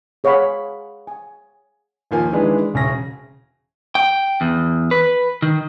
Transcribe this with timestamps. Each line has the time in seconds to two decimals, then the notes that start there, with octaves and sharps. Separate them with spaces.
0.24 G#4 C#5 F5 F#5 B5
1.07 G#5
2.11 D#2 F3 A#3 G#5
2.32 D#3 E3 G#3 D4 G#4 B4
2.74 E1 C#3 G#5 A#6
3.95 G5
4.41 E2
4.91 B4
5.42 D#3